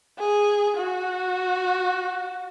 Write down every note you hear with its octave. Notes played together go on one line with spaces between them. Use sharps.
G#4
F#4